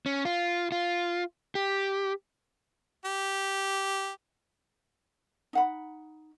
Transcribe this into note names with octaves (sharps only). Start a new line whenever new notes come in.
C#4
F4
F4
G4
G4
D#4 F#5 B5